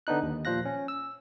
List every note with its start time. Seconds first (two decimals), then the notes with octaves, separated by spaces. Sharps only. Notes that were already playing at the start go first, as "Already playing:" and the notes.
0.07 D3 B3 D4 D#4 F#6
0.23 D#2
0.45 A#2 F3 C5 F5 F#6 A#6
0.65 C#4
0.88 E6